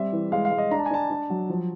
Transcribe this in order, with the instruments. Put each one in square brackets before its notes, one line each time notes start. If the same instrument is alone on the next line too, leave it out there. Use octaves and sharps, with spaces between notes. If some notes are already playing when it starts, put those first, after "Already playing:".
Already playing: [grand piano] G3 C4 E5
E3
G#3 F5
F5
G#3
D#5
D4 A#5
A5
G#5
D4 A5
D4
F#3
F3